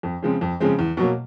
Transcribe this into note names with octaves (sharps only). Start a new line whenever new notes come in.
F2
C#3 F3 G#3 C4
F2
C#3 F3 G#3 C4
E2
B2 F#3 A#3